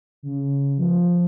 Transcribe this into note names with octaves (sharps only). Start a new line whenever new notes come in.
C#3
F3